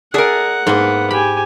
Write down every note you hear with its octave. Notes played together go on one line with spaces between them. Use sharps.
G#4 A#4 D5 E5 F#5 A5
G#2 A#3 B3
G4 G#5 B5